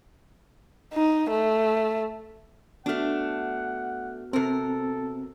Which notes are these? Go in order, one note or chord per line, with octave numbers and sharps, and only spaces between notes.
D#4
A3
A3 B3 D4 F#4 F#5 F6
C3 C4 A4 A#4